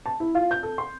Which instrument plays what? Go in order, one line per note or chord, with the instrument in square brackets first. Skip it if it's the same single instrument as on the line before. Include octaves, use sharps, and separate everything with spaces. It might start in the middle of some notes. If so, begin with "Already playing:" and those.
[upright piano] A5
E4
F4
G6
A4
C6